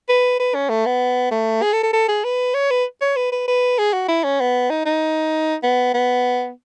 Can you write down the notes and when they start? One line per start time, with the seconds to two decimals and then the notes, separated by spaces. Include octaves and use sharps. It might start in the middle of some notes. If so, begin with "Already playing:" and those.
0.08 B4
0.39 B4
0.54 C#4
0.69 A3
0.86 B3
1.31 A3
1.62 G#4
1.73 A4
1.83 A4
1.93 A4
2.08 G#4
2.24 B4
2.54 C#5
2.70 B4
3.01 C#5
3.16 B4
3.32 B4
3.48 B4
3.78 G#4
3.93 F#4
4.08 E4
4.24 C#4
4.40 B3
4.70 D#4
4.86 D#4
5.63 B3
5.94 B3